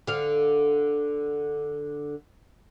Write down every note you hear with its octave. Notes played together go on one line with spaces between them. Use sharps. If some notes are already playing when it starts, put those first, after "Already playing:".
D3 F5